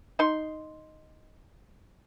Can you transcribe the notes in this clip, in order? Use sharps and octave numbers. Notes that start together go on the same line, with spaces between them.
D#4 C6